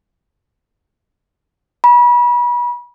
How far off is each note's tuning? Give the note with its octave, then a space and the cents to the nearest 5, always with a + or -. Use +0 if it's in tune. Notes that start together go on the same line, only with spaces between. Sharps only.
B5 -35